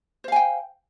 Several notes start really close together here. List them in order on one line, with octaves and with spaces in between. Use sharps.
C5 F5 G#5 G5